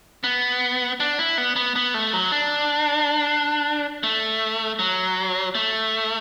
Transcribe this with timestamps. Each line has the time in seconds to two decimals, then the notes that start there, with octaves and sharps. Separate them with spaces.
0.24 B3
1.00 D4
1.19 E4
1.38 B3
1.56 B3
1.76 B3
1.94 A3
2.13 F#3
2.32 D4
4.03 A3
4.79 F#3
5.55 A3